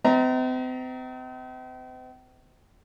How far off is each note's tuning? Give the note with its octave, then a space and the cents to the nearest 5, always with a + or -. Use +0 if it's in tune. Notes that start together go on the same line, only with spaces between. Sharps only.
C4 -40 D#5 +45 A#5 +0